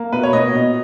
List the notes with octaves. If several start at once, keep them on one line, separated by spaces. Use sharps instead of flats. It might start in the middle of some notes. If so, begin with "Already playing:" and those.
Already playing: A#3
B2 B4
C#5
B2 D#5
B2